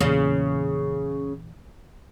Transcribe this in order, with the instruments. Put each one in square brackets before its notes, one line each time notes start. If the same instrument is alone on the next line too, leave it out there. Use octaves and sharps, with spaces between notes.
[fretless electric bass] E2 A#2 [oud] C#3